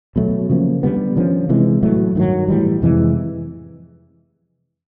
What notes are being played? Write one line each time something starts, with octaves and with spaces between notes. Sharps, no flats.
B2 F#3 A3
C#3 F3 A#3
D3 G3 B3
D3 F3 A#3 C#4
C3 E3 G#3
A2 F#3 A3
G2 D#3 F#3
A2 E3 G3
F2 C3 E3 G#3